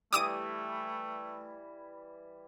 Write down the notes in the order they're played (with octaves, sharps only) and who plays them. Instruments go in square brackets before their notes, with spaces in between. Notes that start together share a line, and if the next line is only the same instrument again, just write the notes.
[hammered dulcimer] E3 G3 [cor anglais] A3 [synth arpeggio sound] D6 D#6 D#7